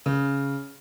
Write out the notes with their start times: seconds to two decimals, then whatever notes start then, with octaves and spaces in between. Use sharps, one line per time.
0.06 C#3